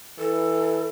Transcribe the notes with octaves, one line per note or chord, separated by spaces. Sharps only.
E3 A4